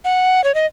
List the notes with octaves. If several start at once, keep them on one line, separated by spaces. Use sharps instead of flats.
F#5
C#5
D#5